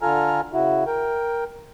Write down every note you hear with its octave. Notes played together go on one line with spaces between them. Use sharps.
D3 F4 A4 G#5 A#5 F6
C#3 E4 F#4
A#4 G5